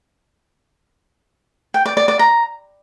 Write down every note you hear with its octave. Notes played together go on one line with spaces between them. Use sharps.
G5
D5
D5
D5
A#5